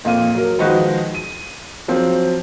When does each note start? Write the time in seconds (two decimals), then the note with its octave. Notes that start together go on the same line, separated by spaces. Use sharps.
0.05 F2 A#2 F5 D#7
0.35 F#3 A#4
0.59 D#3 F3 G#3 D#4 F#4 B4
1.15 D#7
1.88 F3 F#3 C4